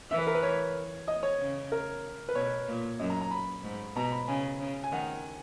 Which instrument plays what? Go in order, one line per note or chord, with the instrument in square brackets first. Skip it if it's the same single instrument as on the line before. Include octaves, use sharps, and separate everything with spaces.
[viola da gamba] E3 [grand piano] E5
[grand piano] B4
A#4
B4
C#5
D#5
C#5
[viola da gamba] C#3
[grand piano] A#4
B4
[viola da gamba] B2 [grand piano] C#5
[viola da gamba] A#2
[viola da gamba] F#2 [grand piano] D#5
[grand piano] A#5
A#5
B5
[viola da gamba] G#2
[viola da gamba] B2 [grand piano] A#5
[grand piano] B5
[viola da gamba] C#3 [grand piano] G#5
[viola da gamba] C#3
[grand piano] G#5
[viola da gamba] D#3 [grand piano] F#5